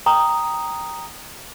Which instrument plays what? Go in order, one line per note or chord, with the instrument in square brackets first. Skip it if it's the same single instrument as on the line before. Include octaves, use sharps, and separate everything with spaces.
[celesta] G5 A#5 D#6